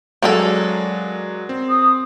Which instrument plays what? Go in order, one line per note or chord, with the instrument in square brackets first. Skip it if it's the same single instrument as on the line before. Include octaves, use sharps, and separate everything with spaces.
[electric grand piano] F#3 G#3 D5 [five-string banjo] A#3 C#4 A4
[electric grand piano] C4
[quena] D#6